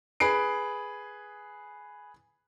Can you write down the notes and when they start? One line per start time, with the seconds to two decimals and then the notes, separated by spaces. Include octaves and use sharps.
0.20 G#4 B4 C7 D7